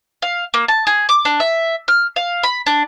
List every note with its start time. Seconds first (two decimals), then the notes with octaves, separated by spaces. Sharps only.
0.22 F5
0.54 A#3
0.68 A5
0.87 G#4
1.09 D6
1.25 D4
1.40 E5
1.88 F6
2.16 F5
2.43 B5
2.66 D4